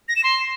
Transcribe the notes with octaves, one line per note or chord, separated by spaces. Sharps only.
A#6
E7
C6